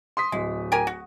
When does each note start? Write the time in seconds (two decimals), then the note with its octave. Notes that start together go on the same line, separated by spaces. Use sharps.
0.17 C6 D#6 B6
0.32 D1 G#3
0.72 G4 A#4 G#5
0.87 F#4